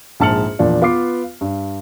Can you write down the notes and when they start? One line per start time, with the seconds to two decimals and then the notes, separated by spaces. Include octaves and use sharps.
0.20 A#1 G#2 A5 F6 C#7 F#7
0.59 E2 A#2 F3 D4
0.82 B3 F4 B4 D6 C7
1.41 G2